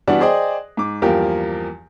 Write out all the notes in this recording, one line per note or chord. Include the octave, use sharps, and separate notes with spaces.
E3 G3 B3 D4 F#4
G#4 C5 D5 D#5 G5
G#2 D6
E2 G2 F3 A#3 G4 A#4